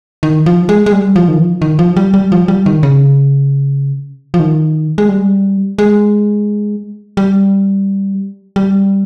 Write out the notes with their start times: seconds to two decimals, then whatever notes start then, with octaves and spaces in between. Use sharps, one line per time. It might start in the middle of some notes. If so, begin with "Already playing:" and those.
0.23 D#3
0.46 F3
0.69 G#3
0.86 G#3
0.92 G3
1.16 F3
1.28 D#3
1.39 F3
1.62 D#3
1.79 F3
1.97 G3
2.14 G3
2.32 F3
2.48 G3
2.66 D#3
2.83 C#3
4.34 F3
4.40 D#3
4.98 G#3
5.09 G3
5.78 G#3
7.17 G3
8.56 G3